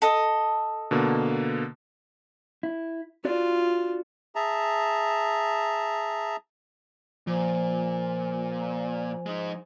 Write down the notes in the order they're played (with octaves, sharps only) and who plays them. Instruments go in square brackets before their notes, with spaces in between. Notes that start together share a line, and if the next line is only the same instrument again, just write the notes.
[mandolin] A4 D#5
[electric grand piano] B2 D3 A#3
[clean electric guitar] E4
[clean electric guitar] D4 F#4 D5 [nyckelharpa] F4
[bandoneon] G#4 E5 A5 A#5
[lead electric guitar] A#2 [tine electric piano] F3 [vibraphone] C5 G#5
[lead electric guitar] G#3 D#4